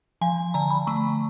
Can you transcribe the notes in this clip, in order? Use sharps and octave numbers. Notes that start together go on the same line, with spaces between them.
F3 G#5
D3 A#5
B5
A3 C#6